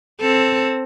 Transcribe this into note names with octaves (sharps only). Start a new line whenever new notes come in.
C4 A4